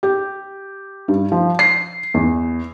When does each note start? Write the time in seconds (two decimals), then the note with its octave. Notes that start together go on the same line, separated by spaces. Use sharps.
0.03 G4
1.08 G2
1.32 F3
1.59 C7
2.14 E2